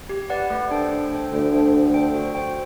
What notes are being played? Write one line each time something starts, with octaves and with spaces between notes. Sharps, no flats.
G4
B4 D5 F#5
A3
D4 A4 C5 G5
A3
D4 A4 C5 G5
D2 D3 A3
D4 A4 C5 G5
A3
D4 A4 C5 G5
F#4
C5 G5